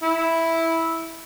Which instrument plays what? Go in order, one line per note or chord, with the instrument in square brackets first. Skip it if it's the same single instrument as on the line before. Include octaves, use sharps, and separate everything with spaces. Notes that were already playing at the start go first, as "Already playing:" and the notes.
[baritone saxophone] E4